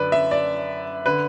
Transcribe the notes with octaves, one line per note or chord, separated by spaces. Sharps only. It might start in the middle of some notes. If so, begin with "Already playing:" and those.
Already playing: F#2 D3 B4 D5
E5
D5
D3 B4